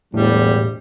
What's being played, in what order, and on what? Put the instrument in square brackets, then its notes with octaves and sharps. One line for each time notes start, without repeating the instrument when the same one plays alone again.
[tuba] E1 [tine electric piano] A2 [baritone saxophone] G3